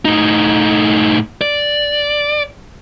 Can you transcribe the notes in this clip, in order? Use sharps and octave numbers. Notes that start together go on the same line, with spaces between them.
A2 D#4
D5